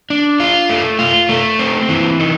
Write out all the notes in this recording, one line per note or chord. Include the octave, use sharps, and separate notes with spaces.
D4
F4
A3
F4
A3
C4
E3
D#4